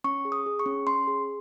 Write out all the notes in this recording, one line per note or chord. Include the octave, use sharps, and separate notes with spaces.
C#4 C#6
G#4
D#6
G#4
C#6
C#4
C#4 C6
G#4